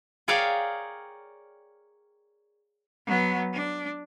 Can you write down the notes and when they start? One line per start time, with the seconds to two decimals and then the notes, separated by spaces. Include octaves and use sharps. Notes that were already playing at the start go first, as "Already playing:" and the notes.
0.28 G#4 A#4 C#5 D5 F5 G5
3.06 F#3 B3
3.53 D4